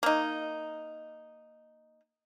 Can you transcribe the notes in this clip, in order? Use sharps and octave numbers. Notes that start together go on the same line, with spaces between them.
A#3 D#4